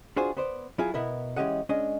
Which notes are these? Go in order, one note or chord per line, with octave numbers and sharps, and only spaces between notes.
D4 F4 F#4 G#4 C5
B3 C5 D5
F#3 E4 F4 G#4
B2 B3 E4 A#4
E3 G#3 C#4 G4 D#5 F#5
G#3 C#4 D4 D#5